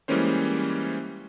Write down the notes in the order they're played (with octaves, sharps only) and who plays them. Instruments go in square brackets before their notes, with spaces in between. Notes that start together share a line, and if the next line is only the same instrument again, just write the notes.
[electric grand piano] E3 G3 G#3 A#3 C#4 C5